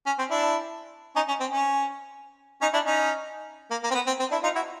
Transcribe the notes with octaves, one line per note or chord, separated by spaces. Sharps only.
C#4
C4
D4 E4
C#4 D#4
C#4
C4
C#4
C#4 D#4
D4 E4
C#4 D#4
A#3
A#3
C4
B3
C4
C4
D4 E4
D#4 F4
E4 F#4